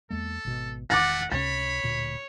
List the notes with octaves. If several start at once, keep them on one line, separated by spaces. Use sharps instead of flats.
E2 G#3 A#3 A4
G#1 B2
E1 D#3 A3 F#5 D6 A6 A#6
C#2 C3 C#4 C#5 B5 A6
D1 D2 A#2